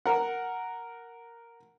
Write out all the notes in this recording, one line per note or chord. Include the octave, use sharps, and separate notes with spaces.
A#4 F#5